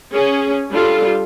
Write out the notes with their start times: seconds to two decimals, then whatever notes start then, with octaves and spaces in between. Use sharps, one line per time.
0.11 C#4 G#4
0.70 G3 D4 F4 A4